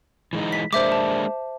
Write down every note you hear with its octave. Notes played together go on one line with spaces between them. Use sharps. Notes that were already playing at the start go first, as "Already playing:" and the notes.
E3 G#3 D#4
B6
G#3 A#3 D4 C5 E5 D6
A5